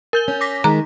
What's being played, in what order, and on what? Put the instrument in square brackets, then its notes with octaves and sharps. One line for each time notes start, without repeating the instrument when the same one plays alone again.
[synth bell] A#4 G6 G7
[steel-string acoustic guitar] C#4
[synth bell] D6 A#6 B6
[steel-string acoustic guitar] D#3 G#3 [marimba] A#5